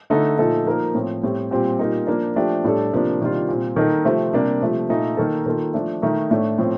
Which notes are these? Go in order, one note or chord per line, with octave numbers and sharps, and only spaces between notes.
D3 A3 D#4 A4
A#2 F3 A3 D#4 A4
F3 A#3 D#4 A#4
A2 F3 C4
A2 G3 C4
A#2 G3 C4 G4
A#2 G3 A#3 D#4
F3 A#3 D4
F3 A3 D4 G4
A2 G3 D4 A4
C3 F3 A#3 D4
C3 D#3 G3 D4 F4
A#2 G3 C4
D#3 A#3 D#4 A4
C3 F3 A3 C4
C3 G3 A#3 D4
C3 F3 A3
A#2 A3 D#4 A4
D#3 A#3 D#4 A4
D#3 A#3 F4 A4
F3 A3 D4
D#3 A3 D#4
A2 A3 D4
A2 F3 C4